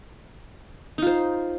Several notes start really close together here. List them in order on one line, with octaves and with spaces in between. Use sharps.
D#4 F4 C5